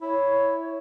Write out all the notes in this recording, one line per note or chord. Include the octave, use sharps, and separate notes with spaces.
E4 C#5